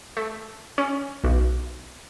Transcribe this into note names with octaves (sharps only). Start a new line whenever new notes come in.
A3
C#4
B1